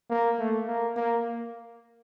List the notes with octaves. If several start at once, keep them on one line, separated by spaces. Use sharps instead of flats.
A#3
A3
A#3
A#3